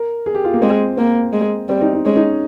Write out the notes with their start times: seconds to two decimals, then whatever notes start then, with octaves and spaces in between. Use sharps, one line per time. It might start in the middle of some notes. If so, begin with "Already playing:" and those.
Already playing: A#4
0.26 G#4
0.35 G4
0.44 F4
0.54 A#3
0.62 G#3 C4
0.97 A#3 C4
1.33 G#3
1.69 G3 C4
1.81 D#4
1.93 D#4
2.05 G#3 C#4
2.16 D#4